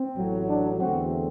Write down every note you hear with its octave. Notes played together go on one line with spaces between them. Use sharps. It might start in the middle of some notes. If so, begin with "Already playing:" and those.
Already playing: C4
A1 A2 F#3
D4
E2 D3 A3 C4 F#4